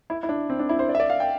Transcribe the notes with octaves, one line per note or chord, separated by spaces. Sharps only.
E4
E4
D4
C4
D4
E4
C5
D5
E5
D5
F5
G5